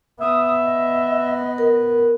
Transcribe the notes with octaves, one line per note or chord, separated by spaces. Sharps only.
B3 E5 D#6
D#5
A#4